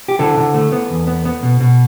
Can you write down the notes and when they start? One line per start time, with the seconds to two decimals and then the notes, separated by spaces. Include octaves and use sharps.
0.08 G4
0.19 D3 E4 A4
0.37 D3
0.54 A3
0.72 B3
0.90 E2
1.07 B3
1.25 B3
1.43 B2
1.60 B2